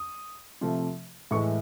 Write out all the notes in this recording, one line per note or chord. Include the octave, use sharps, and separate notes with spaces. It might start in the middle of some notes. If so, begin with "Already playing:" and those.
Already playing: D#6
C3 F3 A3
A2 E3 G#3 C#6